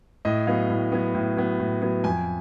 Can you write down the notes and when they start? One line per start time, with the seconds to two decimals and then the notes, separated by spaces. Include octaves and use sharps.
0.25 A2 D#5
0.47 F#3 B3 F5
0.70 A2
0.92 F#3 B3
1.15 A2
1.37 F#3 B3
1.60 A2
1.82 F#3 B3
2.04 F2 G#5